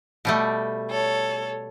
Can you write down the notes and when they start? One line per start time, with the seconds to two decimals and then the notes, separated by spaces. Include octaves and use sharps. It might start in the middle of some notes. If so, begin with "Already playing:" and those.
0.25 B2 G3 A3
0.90 A4 C#5